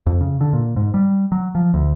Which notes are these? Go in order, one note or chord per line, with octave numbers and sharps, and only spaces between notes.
F2
C#3
D3
A#2
G#2
G3
F#3
F3
D2